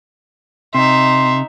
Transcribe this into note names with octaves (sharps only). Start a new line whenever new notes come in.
C3 D#4 E5 C6